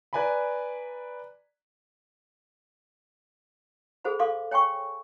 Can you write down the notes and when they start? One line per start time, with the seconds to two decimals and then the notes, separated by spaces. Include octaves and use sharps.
0.13 B4 D5 G#5 A#5 B5
4.05 G#4 A4 C5 F#5 B5
4.19 A4 F5 C6 D6
4.51 C#5 G5 G#5 C6 C#6